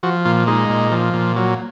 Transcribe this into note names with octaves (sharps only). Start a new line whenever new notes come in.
F3 F#4
A#2 F4
G#3 D#4
A#2
F3
A#2
F#3